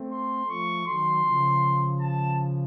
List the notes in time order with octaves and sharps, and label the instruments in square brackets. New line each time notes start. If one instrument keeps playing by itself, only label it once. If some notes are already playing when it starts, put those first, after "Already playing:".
Already playing: [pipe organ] A3 C4
[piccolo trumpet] C6
[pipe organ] F3 A3 [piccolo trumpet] C#6
[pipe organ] D#3 F#3 [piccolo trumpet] C6
[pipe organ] C#3 F3
[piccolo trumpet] A5